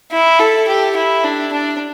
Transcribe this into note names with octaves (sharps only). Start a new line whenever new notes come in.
E4
A4
G4
E4
D4
D4